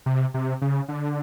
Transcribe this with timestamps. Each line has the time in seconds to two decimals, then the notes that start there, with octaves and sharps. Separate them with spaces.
0.06 C3
0.34 C3
0.62 C#3
0.88 D3